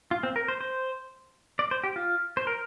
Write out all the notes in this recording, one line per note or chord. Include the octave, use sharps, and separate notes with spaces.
F4
C4
A#4
C5
C5
D5
C5
G4
F4
C5
A#4